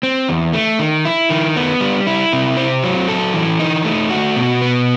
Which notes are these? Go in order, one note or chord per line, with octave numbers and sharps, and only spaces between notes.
C4
E2
A3
D#3
E4
D#3
B3
G3
E4
C3
C4
F#3
A4
E3
D#4
A3
F#4
B2
B3